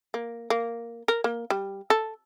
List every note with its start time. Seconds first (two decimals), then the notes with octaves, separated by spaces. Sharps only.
0.14 A#3
0.50 A#3
1.08 A#4
1.24 A#3
1.50 G3
1.90 A4